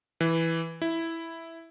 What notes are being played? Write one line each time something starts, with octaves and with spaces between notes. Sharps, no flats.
E3
E4